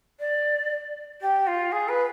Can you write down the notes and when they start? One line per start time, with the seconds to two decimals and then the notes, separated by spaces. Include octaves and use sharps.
0.19 D5
1.21 G4
1.47 F4
1.72 G#4
1.88 B4